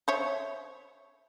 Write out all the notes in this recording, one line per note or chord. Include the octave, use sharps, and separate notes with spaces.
C5 C#5 E5